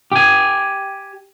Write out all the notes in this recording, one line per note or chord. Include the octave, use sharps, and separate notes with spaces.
G4 G#5